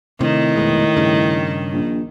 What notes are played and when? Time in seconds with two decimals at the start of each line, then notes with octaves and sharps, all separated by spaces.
0.21 A2 C3 D#3
0.56 F1 B2 G#3
0.97 G2 C#3
1.72 A#1